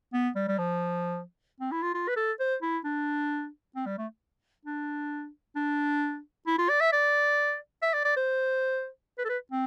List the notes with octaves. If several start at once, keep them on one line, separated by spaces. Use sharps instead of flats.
B3
G3
G3
F3
C4
E4
F4
F4
B4
A4
C5
E4
D4
C4
G3
A3
D4
D4
E4
F4
D5
E5
D5
E5
D5
D5
C5
B4
A4
B4
C4